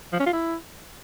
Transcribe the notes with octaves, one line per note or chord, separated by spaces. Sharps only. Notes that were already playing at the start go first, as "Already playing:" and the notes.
F3
C#4
F4
E4